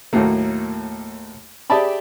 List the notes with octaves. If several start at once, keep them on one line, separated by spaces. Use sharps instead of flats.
D#2 A2 F#3 A3 A#3
G4 G#4 D5 E5 A5 B5